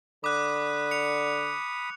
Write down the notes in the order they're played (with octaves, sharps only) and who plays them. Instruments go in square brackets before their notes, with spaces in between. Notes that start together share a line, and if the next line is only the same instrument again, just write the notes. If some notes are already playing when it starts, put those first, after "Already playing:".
[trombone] D3 [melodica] B5 D#6 [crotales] D6 F#6
[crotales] C#7 F7